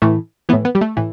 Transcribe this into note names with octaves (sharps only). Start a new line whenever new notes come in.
A2 E3 A3
A2 E3 B3
B3
G3
A3
A2 E3